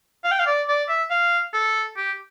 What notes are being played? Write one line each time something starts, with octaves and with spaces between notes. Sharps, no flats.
F5
G5
F5
D5
D5
E5
F5
A4
G4